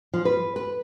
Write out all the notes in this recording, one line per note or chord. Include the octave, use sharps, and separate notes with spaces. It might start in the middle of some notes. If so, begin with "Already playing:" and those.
F3
B4
B4